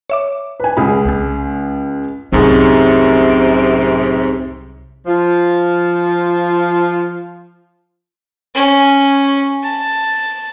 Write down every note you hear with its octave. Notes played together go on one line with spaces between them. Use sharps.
C#5 E5 D6
B4 G#5
C#2 G#4 B5
C2 G#3
C2 F#2 A2 C3 F#3 C4 D#4 G#4
F3 F4
C#4
A5